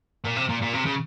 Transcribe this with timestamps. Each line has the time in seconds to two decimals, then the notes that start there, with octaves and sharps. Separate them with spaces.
0.25 A#2
0.36 C3
0.49 A#2
0.62 A#2
0.73 C3
0.86 C#3